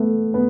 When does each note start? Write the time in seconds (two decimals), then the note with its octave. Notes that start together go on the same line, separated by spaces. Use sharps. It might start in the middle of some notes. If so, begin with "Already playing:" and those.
Already playing: A3 B3
0.34 B3